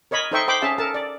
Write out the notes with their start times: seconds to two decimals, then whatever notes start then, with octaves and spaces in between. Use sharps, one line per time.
0.11 A#4 C#5 D#5 B5
0.32 D#4 A4 C5 E5 G5 C#6
0.48 C5 G5 B5 D6
0.62 C#4 G#4 E5 F5 A5
0.78 A4 A#4 A5
0.94 D5